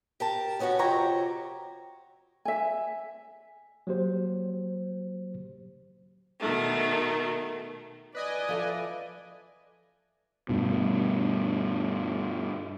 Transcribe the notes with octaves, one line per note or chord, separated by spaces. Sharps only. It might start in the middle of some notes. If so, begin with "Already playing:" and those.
G4 A#4 A5
C#3 B3 C#4 D4 F#4
F2 C3 F#4 G4 C#5 A#5
E5 G#5
F#3 A#3 G4 C5
B2 D#3 A3
B4 D5 D#5 G#5
F3 A4 E5
G2 B2